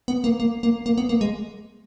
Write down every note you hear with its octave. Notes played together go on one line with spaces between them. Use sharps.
B3
A#3
A#3
A#3
A#3
B3
A#3
G#3